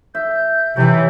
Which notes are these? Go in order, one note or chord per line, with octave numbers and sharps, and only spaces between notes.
E5 G6
C3 E3 C#5 E5